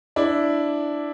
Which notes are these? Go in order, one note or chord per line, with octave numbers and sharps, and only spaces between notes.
D4 E4